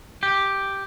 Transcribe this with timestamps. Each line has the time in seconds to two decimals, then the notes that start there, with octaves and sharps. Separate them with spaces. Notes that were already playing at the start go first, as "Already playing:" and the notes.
0.23 G4